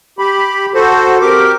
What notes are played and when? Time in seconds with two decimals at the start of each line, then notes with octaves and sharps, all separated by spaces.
0.19 G4 B5
0.75 F#4 A4 C5
1.21 C4 G4 A#4 D6